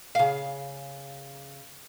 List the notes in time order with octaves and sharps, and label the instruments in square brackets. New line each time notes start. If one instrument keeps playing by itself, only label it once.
[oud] C#3 F5